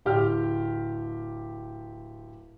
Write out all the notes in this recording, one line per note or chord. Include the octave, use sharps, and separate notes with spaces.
D1 G4 G5 F6